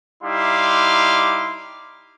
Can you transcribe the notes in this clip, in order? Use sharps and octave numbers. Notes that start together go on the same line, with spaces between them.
G3 D#4 E4 F5 C6 D6